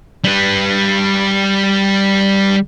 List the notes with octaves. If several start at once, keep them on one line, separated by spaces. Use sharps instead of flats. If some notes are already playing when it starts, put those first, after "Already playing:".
G3 B4